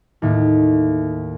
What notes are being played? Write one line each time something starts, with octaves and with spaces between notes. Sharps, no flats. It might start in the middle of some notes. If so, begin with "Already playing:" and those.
D#2 A2